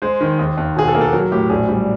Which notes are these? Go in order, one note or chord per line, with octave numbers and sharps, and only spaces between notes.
G#3 C5
D#3
D#2
D#2
B2 G#4
A4
A#3
A4
F#3 A#4
A2 G4
A#1 G#4
G3